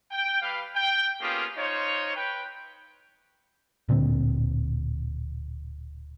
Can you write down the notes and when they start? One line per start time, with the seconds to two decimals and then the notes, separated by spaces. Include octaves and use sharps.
0.11 G5
0.42 G3 B4 F5
0.74 G5
1.21 A#3 B3 C#4 F4 G4 G#4
1.57 D#4 F4 C5 C#5
2.16 B4 G5
3.89 D1 A#2 D3 C4